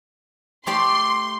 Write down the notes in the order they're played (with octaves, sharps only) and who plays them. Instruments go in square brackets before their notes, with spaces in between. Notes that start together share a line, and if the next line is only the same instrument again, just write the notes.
[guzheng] A3 G4 D5 [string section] C6